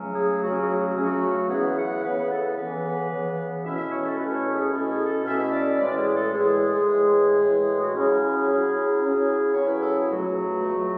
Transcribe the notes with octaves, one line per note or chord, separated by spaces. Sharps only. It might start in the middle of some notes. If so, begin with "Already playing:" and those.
Already playing: C#2 C#3 F#3 A3 C#4
G#4
C#2 C#3 F#3 A3 C#4 F#4
G#4
F#4
G#4
F#4
C#2 C#3 F#3 A3 C#4 G#4
F#4
C#3 E3 B3 G#4
F#5
C#3 E3 B3 B4
A4
C#3 E3 B3 B4
C#3 E3 B3
B2 A3 C#4 E4 E5
E5
C#5
A4
B2 A3 C#4 E4 B4
B4
C#5
G#4
B2 A3 C#4 E4 A4
G#4
A4
B2 A3 C#4 E4 E5
D5
A2 E3 G#3 D5
G#4
A4
A2 E3 G#3 G#4
A2 E3 G#3
A2 E3 G#3
F#4
C#3 F#3 C#4 E4 G#4
C#3 F#3 C#4 E4
C#3 F#3 C#4 E4
C#3 F#3 C#4 E4 C#5
B4
A4
G#4
C#2 B2 F#3 A3 F#4
C#2 B2 F#3 A3